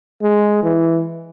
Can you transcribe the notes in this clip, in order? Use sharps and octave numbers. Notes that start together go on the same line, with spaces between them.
G#3
E3